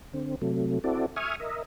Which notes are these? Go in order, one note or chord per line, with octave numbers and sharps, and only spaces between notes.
D3 C4
C3 F#3 A3
C4 E4 F#4 A4 D5
E5 G#5 C#6 D#6 F6
A#4 D#5 E5